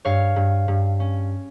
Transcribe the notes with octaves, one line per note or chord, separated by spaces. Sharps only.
G2 C#5 F5
G2
G2
C#4